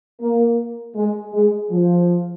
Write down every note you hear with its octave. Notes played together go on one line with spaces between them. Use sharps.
A#3
G#3
G#3
F3